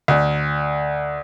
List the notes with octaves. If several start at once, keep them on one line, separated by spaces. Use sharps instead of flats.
D2